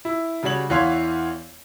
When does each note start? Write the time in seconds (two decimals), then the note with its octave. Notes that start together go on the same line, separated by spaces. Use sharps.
0.05 E4
0.43 C#3 G3 F#4 C#5 F#7
0.69 E2 E3 B3 C#5 F5 C6